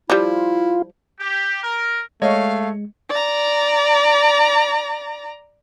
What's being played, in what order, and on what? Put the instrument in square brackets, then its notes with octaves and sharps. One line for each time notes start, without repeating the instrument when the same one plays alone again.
[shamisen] F3 G3 [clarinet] E4 [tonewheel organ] F4
[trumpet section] G4
A#4
[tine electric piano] G#3 [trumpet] A3 [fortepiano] C#5 D#5 [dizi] F5
[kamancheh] D5 A#5